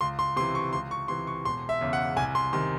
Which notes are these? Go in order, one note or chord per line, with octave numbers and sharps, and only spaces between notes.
C#2 C6
C6
C3 E3 C6
C#6
C#2 C6
C#6
C3 E3 C6
C#6
E1 C6
E5
E2 C#3
F#5
C2 G#5
C6
C3 D#3 C6